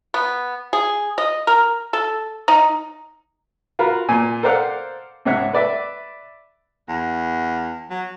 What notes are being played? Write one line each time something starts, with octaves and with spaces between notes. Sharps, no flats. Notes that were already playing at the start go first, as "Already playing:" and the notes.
B3
G#4
D#5
A#4
A4
D#4
F4 F#4 A#4 B5
A#2 G#5
A4 A#4 C5 D5 F5 F#5
C#2 G#2 C#5 E5 F#5
B4 D5 E5
E2
F#3